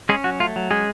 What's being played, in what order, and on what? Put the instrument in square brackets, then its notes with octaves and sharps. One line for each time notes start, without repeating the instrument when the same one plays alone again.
[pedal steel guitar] G#3 C#4 G#4
F#3 F#4
A3 F4
F#3
G#3 C#4 G#4